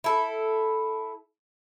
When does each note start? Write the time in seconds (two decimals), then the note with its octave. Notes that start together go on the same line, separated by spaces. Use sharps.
0.04 E4 A4